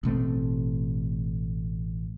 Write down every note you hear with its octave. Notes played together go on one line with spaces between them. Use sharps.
A1 B2 A3 C4